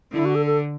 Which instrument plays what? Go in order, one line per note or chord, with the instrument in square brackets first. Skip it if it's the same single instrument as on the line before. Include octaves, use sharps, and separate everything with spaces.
[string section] D3 [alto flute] E4
[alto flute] F#4
A4
A4